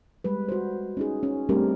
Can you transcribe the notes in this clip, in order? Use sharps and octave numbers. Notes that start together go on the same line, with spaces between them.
G3 G#3 B4
F#4 C5
C#4 D#4 G#4
C#4
G3 A3 C4 D4 G4 A#4